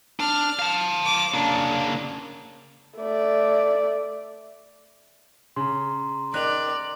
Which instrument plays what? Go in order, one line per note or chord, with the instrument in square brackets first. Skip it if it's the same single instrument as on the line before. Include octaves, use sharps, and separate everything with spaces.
[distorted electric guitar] D4 [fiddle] F6
[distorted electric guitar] F5 A5
[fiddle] D6
[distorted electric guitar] C#3 A#3 [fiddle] D4
[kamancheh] A3 D5
[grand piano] C#3 [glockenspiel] A#5 C6
[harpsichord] D#3 [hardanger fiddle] D5 [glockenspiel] F#6 F7 F#7